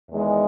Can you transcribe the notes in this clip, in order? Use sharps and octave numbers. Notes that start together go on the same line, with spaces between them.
E2 D#3 G#3